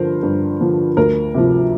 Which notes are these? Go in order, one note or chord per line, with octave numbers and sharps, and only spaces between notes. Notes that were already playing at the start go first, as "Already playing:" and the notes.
Already playing: G2 D3 F3 A#4 C5
G2
D3 F3
D2 A#4
C3 F3